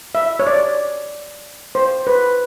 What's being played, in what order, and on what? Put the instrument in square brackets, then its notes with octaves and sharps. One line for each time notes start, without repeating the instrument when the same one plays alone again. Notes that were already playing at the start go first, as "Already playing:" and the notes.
[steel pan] E5
C#5
D5
C5
B4